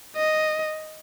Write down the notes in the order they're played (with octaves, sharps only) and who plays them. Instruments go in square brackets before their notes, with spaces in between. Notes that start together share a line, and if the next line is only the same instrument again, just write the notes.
[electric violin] D#5